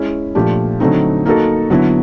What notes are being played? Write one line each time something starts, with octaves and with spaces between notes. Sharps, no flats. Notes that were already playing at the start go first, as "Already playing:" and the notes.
Already playing: G#3 C#4 E4
A#2 F3 A3 D4 G4
D3 F#3 A3 C4 D#4
A#3 D#4 F#4 A4
D3 F#3 B3 E4